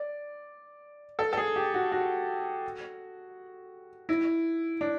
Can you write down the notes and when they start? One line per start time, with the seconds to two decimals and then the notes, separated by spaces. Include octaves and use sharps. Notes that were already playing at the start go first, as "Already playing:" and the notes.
Already playing: D5
1.19 A4
1.33 A4
1.37 G#4
1.56 G4
1.74 F#4
1.92 F#4
4.09 E4
4.81 D4